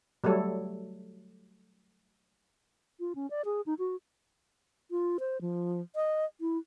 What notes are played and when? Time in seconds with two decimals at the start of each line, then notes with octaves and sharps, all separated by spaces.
0.24 F#3 G3 A3 A4 C#5
3.00 F4
3.15 C#4
3.30 D5
3.45 G#4
3.66 D#4
3.79 F#4
4.91 F4
5.20 C5
5.41 F3
5.95 D#5
6.41 E4